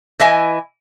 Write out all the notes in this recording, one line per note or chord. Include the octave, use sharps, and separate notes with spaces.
E3 E4 D#5 E5 G#5